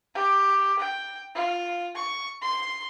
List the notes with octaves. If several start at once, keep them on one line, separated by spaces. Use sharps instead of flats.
G4
G5
F4
C#6
C6